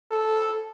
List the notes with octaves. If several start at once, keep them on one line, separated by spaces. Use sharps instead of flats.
A4